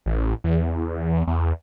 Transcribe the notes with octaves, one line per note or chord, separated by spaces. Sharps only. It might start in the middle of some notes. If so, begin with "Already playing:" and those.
A1
E2
E2